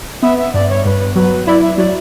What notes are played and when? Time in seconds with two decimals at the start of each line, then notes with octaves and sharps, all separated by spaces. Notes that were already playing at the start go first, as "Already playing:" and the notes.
0.22 B3 E5
0.38 E5
0.54 G2 D5
0.69 C#5
0.85 G2 B4
1.16 F#3 B4
1.47 E4 D5
1.62 E5
1.77 F#3 D5